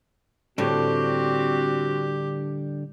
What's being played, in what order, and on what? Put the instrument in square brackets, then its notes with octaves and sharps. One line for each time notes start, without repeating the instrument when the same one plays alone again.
[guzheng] A2 [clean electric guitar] D3 G3 D4 [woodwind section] C4 F#4 [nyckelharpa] G4